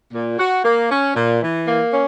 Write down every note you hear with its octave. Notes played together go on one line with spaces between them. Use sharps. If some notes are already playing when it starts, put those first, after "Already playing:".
A#2
F#4
A#3
C#4
A#2
E3
A#3
C#4